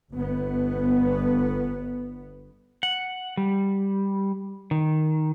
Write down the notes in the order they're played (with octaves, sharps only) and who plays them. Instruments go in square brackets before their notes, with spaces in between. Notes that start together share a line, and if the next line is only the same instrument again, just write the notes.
[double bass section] G1 B3
[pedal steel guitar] F#5
G3
D#3